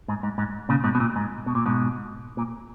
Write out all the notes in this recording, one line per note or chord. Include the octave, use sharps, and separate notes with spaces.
G#2
G#2
G#2
A#2 C#3
G#2 B2
B2
A#2
G#2
B2
A#2
G#2 B2
A#2